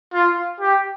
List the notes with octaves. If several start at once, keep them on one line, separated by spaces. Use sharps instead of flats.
F4
G4